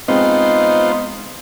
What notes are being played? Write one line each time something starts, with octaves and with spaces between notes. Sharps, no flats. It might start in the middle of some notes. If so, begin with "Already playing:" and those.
G#3 B3 C4 D#4 F4 C5